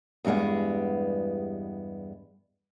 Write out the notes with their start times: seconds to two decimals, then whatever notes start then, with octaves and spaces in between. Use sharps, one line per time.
0.25 E2 G2 G3 G#3 B3